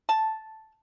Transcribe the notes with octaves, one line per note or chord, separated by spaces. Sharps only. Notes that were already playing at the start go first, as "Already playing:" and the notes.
A5